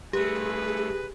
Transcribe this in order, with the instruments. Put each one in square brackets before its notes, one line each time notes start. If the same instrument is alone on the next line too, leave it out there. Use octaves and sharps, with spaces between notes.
[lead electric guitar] G2 A3 [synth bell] G4 [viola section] G#4 [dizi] B4